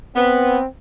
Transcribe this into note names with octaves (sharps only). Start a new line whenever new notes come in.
B3 C4